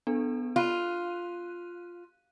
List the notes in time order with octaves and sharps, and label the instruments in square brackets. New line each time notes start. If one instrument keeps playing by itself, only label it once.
[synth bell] B3 D4 A4
[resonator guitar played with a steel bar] F4 [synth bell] F5 F#6 D#7